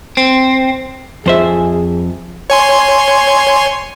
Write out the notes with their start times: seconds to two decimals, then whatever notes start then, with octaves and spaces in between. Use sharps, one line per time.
0.17 C4
1.26 F2 G#4 C5 E5
2.50 C#5 G#5 C6